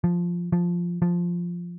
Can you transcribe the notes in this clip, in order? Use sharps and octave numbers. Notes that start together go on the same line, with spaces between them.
F3
F3
F3